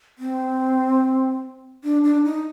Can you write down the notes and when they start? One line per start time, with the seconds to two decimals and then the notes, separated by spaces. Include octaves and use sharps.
0.18 C4
1.84 D4
2.04 D4
2.25 D#4